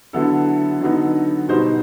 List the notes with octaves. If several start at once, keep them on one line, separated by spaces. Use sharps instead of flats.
D3 F#3 B3 E4 A4
D3 F#3 B3 D#4
B2 G3 B3 D#4 C5